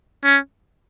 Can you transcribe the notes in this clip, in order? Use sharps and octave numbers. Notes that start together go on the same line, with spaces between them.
C#4